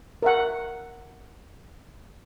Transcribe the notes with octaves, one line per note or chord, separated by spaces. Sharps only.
A#4 E5 F#5